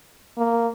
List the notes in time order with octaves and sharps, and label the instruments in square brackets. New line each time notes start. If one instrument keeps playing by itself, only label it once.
[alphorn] A#3